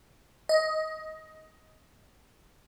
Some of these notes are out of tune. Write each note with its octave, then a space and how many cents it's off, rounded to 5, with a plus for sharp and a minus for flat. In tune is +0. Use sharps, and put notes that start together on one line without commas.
D#5 +15